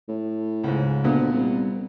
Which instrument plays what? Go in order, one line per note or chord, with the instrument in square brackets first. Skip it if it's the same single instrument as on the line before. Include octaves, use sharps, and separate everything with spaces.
[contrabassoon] A2
[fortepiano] C#2 G#2
[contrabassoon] D2 [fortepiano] A#2 B3
[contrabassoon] C2